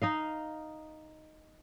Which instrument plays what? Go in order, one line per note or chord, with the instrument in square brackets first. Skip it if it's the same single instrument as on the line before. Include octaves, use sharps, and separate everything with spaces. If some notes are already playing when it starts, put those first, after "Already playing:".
[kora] D#4 D#5 F5